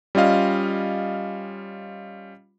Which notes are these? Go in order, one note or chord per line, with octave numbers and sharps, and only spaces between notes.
G3 C#4 F4 D#5 F5